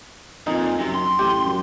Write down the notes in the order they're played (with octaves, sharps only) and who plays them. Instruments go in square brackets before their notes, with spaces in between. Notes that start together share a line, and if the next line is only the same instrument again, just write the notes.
[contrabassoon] F2 [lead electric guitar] A#2 [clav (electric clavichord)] D#4
[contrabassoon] F#2 [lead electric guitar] C3
[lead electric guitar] C6
[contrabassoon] A1 [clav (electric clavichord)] G4
[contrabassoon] F#2